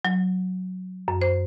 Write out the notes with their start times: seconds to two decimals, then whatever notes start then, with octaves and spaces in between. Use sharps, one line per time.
0.05 F#3
1.08 F#2
1.22 C5